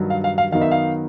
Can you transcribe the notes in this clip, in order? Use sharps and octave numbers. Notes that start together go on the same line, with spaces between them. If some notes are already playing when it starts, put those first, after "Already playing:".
Already playing: G2 D#3 F#3
F5
F5
F5
F#2 D#3 F#3 B3 D#4 F5
E5
F5